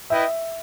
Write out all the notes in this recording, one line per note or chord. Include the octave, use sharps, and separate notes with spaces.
E4 B4 D#5 E5 G5